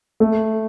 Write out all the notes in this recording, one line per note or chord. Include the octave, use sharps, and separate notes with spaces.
A3